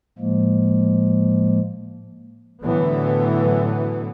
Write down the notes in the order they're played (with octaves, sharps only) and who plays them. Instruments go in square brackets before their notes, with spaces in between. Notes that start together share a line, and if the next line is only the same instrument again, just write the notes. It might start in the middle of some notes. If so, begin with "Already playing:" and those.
[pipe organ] A2 F3 G#3 A#3
[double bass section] A2 D3 E3 F#3 B3